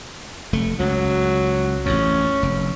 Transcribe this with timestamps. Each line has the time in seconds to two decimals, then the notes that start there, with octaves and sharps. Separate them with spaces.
0.53 F1 A3
0.80 C#2 F#3
1.86 A1 F2 C#4
2.43 F1